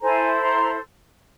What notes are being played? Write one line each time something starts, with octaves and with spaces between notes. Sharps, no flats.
E4 A4 C5 G#5 A#5
A#5 C6